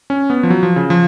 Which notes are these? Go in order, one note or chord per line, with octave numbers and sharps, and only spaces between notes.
C#4
B3
F3
F#3
F3
C#3
F3